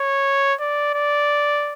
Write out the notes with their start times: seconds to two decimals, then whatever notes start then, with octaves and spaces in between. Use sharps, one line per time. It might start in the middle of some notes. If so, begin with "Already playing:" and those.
Already playing: C#5
0.60 D5
0.94 D5